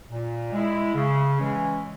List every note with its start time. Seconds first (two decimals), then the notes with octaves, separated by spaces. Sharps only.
0.11 A#2
0.52 G#3 E4
0.95 C#3
1.37 E3 G#3 C#4